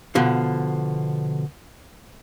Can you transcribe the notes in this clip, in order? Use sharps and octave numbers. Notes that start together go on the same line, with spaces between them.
B2 D3 F3